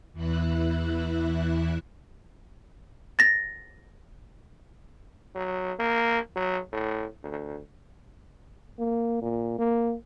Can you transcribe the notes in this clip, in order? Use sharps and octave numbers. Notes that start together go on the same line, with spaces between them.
E2 E3 E4 F#6
A6 A#6
F#3
A#3
F#3
A2
D2
A#3
A#2
A#3